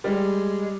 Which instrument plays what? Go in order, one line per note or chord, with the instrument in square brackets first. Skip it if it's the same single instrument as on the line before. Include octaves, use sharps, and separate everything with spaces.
[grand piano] G3 [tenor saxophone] G#3